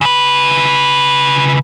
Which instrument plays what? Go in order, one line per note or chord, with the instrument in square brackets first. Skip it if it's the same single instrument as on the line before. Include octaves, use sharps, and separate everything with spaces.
[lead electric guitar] C#3 B4